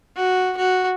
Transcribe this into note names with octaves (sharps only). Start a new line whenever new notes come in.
F#4
F#4